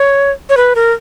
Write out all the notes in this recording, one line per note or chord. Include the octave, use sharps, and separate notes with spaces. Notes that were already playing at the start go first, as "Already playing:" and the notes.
Already playing: C#5
C#5
B4
A#4